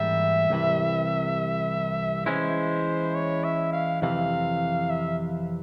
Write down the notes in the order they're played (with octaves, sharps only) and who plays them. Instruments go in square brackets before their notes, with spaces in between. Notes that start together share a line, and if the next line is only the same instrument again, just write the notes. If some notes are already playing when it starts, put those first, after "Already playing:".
Already playing: [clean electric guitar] G#2 E3 G3 A#3 C#4 [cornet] E5
[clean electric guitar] C2 C3 E3
[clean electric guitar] E3 G#3 C#4 E4 [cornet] C5
[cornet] C#5
E5
F5
[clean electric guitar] F2 C3 E3 [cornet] F5
[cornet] E5